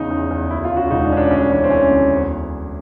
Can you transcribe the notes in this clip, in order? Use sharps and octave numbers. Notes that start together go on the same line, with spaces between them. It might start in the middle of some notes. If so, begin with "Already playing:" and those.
Already playing: E2 C#3 D#4
E2
E2
D2 E4
F4
C#3
F#4
E1 D#4
D4
C#3 C#4
D4
D2 C#4
D4
E3 C#4
C4
E3 C#4
D2
E2